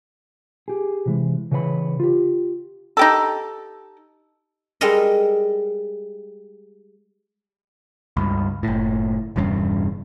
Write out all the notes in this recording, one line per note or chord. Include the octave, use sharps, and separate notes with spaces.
G4 G#4
C3 E3 G#3
C#3 E3 B4 C#5 F5 B5
F4 G4
D#4 G4 A4
G3 G#3 A4 A#4 D#5
C#2 G2
F#1 A2
E1 E2 G2 C#3